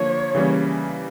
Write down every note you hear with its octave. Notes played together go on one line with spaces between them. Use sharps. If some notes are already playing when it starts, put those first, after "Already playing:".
Already playing: D3 F3 A#3 C#5
C#3 E3 G3 A#3 C#4